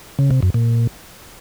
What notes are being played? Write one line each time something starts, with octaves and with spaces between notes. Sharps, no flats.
C#3
C3
F#2
A#2